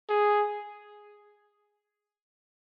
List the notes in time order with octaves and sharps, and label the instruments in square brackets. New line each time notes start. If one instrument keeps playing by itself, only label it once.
[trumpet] G#4